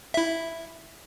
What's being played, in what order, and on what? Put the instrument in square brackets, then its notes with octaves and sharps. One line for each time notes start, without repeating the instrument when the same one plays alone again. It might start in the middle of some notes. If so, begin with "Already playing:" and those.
[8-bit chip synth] E4 E5